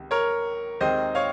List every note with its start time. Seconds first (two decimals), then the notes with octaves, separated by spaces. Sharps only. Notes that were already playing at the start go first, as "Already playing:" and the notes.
Already playing: C#2 C3 D#3
0.11 A#4 C#5
0.81 D#2 D#3 G#3 C4 C5 D#5
1.15 C#5 F5